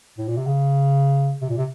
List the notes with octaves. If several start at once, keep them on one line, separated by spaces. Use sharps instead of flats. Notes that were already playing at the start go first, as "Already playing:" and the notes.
A2
A#2
C3
C#3
C3
A#2
C3